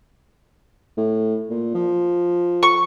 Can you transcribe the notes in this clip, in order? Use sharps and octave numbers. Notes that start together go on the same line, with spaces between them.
A2
A#2
F3
C#6